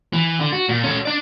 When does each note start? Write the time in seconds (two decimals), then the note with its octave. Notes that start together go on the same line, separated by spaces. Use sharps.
0.13 E3
0.40 D3
0.53 F#4
0.69 A#2
0.83 C#4 A4
1.05 D4 D5